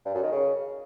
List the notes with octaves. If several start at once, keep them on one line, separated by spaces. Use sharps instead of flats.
G2
F#2
D#3
C#3